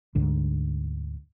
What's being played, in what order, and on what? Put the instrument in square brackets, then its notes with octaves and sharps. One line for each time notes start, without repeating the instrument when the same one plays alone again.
[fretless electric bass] D2 G#2 D3